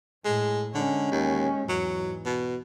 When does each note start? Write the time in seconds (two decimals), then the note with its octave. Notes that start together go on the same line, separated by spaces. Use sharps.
0.25 A2 G#3
0.75 D3 G#3 C#4
1.12 D#2
1.69 E2 G#2 F#3
2.25 B2